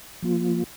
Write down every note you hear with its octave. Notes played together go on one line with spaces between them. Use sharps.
F3 A#3 F4